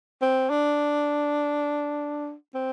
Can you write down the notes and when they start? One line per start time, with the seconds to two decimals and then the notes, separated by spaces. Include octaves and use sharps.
0.22 C4
0.50 D4
2.54 C4